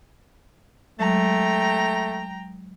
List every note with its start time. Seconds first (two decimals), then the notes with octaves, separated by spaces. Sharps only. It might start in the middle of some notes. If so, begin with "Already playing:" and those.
1.00 F#3 G#3 A3 G5 A#5